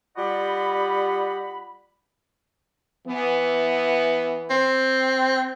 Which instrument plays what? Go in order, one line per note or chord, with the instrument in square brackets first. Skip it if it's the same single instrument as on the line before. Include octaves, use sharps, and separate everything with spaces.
[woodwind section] G3 F4 G4 D#5 F#5 B5
[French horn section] E3 B3
[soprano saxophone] C4